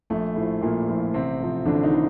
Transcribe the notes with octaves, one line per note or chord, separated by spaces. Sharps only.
A#1 A3
A2 F3
A#1 A#2 A#3
A2 F3
A1 C3 C4
A2 F3
A1 D3 D4
D#3 D#4
A2